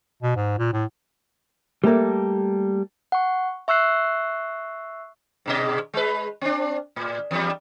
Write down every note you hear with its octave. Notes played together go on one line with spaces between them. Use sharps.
B2
G#2
A#2
A2
G3 A3 A#3 A4
F#5 C#6
E5 C#6 E6 F#6 C7
G#2 B2 D#5
G#3 B4
C4 D4
A2
E2 G3